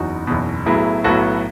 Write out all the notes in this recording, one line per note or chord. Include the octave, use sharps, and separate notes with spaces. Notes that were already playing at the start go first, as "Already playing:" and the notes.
Already playing: F#1 E2 D#4 F#4
F#1 E2 B2
B1 A2 F#3 B3 E4 G#4
B1 A2 F#3 B3 F#4 A4